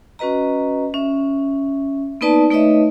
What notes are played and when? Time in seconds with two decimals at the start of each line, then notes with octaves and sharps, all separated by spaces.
0.19 C#4 F#4 B4 D#5 A#5
0.94 C#4 E5
2.21 A#3 B3 D#4 B4 D5 A5
2.50 A3 D#4 B4 C#5 D#5 E5